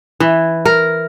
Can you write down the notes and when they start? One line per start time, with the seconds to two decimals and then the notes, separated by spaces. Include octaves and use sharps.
0.20 E3
0.65 A#4